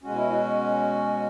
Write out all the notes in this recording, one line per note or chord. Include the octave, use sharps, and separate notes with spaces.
B2 G#3 C#4 F#4
E4
F#4